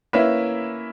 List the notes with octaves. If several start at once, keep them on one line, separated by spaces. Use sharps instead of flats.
A#3 C#4 E4 B4 E5